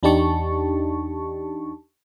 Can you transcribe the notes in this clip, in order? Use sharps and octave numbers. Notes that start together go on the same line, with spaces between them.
E2 D4 D#4 G4 A5 C#6